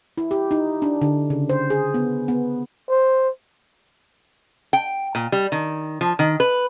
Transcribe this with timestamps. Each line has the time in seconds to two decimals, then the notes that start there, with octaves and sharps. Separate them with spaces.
0.18 E4
0.31 G4
0.51 D#4
0.82 D4
1.02 D3
1.30 C#3
1.49 C5
1.70 G#4
1.94 B3
2.28 B3
2.89 C5
4.73 G5
5.15 A#2
5.32 G3
5.52 D#3
6.01 F3
6.19 D#3
6.40 B4